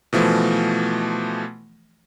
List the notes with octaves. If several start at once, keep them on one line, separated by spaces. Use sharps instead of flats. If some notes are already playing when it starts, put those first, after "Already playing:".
B2 E3 F3 A3